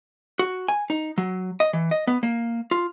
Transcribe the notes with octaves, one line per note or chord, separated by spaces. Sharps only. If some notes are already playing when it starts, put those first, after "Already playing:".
F#4
G#5
D#4
F#3
D#5
E3
D#5
B3
A#3
F4